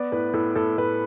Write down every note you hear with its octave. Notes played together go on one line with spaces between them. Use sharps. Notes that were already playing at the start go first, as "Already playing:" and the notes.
Already playing: B3 D5
A2 B4
A2 A4
A2 A4
A2 B4